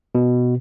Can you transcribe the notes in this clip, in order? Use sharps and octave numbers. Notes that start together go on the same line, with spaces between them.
B2